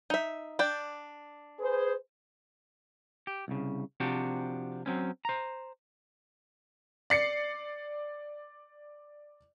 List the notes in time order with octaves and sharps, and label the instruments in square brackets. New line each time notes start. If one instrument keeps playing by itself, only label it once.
[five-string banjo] D#4 E5
D4 D5 G5
[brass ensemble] G#4 B4 C5
[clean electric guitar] G4
C2 C#3
C3 F3 D4 F#4 G4
F#3 C4 C#4
C5 A#5
[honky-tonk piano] D5 C7 C#7